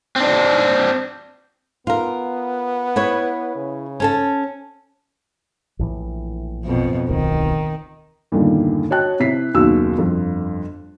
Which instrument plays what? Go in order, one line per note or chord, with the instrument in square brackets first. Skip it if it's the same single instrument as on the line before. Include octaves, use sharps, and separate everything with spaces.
[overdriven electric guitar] C4 D4
[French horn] B3 [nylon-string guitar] F4 A#4
[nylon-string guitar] E4 B4 C#5
[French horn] C#3
[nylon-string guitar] C#4 A4 A5
[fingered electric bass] A#1 A2 E3
[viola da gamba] F2 B2
[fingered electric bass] D1 B1 B2 [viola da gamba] D#3
[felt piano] E2 G2 A#2 D3 D#3
F#4 C#5 D#5 G5 A5 F#6
C3 E4 B6 C7
F#1 D#2 B2 F#4 E6
G1 F2